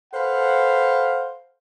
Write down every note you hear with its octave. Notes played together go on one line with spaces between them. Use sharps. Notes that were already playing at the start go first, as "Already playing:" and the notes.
A4 B4 C5 F5 F#5